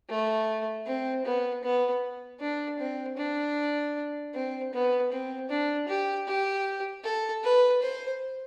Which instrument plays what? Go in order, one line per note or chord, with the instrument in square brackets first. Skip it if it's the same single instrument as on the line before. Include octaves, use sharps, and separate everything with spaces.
[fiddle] A3
C4
B3
B3
D4
C4
D4
C4
B3
C4
D4
G4
G4
A4
B4
C5